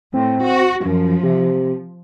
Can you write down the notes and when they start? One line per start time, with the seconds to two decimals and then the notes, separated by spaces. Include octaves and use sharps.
0.14 A2 C4
0.44 F#4
0.85 F#2 F3
1.23 C3